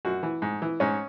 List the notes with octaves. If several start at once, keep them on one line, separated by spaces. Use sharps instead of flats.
F#2 F#4
E3
G#2
E3
G#2 C#4